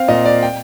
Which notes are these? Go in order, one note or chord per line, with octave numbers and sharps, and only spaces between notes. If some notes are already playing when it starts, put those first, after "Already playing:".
Already playing: C4 F5
A#2 D#5
D5
G5